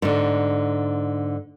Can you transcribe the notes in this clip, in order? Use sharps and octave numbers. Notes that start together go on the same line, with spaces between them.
G#2 D3